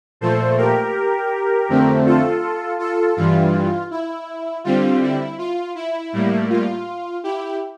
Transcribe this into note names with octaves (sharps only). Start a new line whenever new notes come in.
A#2 F3 A3 A4 C5
G4 A#4
F2 D3 A3 C4
F4 A4
F4 A4
G2 E3 G3 F4
E4
D3 G3 C4 F4
E4
F4
E4
A2 G3 A#3
F4
E4 G4